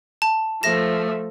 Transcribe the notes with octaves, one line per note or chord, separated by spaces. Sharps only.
A5
F3 A3 E5 A#6 E7